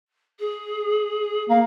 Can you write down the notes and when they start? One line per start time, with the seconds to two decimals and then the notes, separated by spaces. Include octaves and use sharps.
0.39 G#4
1.49 A#3 F5